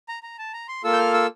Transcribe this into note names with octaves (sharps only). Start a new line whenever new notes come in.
A#5
A#5
A5
A#5
C6
A#3 F4 A4 E6
G6
F6
E6